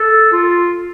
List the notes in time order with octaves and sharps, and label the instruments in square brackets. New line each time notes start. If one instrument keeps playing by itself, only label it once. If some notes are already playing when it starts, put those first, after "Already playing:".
Already playing: [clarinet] A4
F4